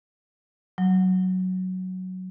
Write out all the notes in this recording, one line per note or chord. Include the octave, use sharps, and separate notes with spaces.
F#3